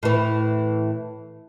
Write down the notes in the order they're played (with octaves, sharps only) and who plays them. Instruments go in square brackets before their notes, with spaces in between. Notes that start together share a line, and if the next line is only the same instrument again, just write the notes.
[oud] A2 E3